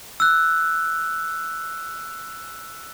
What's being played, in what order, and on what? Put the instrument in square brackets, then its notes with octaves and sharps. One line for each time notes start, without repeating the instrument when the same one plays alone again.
[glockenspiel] E6 F#6